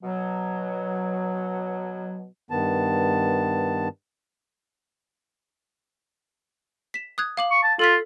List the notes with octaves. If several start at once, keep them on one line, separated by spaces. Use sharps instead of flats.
B2 F#3
G2 D#3 B3 A5
B6 E7
D#6 F#6 G#6
F5 D6 F#7
C#6
A5
F4 A4 F6 B6